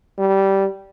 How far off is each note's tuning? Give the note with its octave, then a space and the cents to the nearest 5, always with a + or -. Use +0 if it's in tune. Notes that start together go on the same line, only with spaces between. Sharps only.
G3 -15